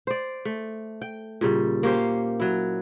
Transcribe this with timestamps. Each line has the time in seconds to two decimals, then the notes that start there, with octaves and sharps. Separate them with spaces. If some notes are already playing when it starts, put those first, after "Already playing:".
0.07 C5 D5
0.45 A3
1.02 G5
1.41 A#2 C#3 G3
1.83 A#3 C#4 G4 C5
2.40 F#3 E4